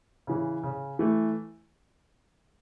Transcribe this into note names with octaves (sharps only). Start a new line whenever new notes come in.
C#3 E3
C#3
E3 A3